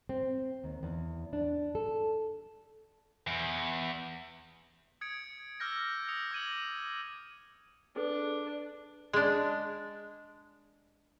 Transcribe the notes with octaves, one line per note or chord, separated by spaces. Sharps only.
C4
D#2
E2
D4
A4
E2
D#6 G#6 C#7 D7
D6 E6 F6 G6 A#6
D#6 C#7 F7
D6 G#6 D#7 F#7
D4 G#4 A4 B4
G#3 D4